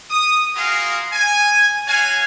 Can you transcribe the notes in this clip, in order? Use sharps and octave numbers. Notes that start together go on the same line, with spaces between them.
D#6
F4 F#4 G#4 A#4 F5
G#5
F#4 C#5 F5 G#5